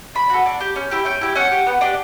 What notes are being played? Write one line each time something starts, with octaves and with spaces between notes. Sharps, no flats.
D4 B5
F#4 A4
D4
G4
C#4
E4 G4
C#4 G5
E4 G4
C#4 F#5
G4
B3
D4 G4